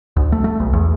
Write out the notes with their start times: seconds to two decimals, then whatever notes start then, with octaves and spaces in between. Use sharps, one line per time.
0.16 D2
0.32 A3
0.44 A3
0.60 B1
0.73 E2